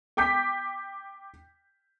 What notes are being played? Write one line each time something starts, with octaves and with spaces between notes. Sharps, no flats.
G5 D6 G6 B6